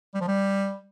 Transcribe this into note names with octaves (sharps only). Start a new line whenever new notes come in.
G3
F3
G3